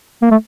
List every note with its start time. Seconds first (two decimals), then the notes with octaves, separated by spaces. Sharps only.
0.22 A#3
0.31 A3